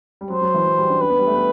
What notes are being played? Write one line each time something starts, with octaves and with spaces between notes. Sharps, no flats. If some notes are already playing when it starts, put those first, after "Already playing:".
G3
F#3 C5
F#3
E3
F#3
G3
D4
D4 B4
B3
G3
A3
B3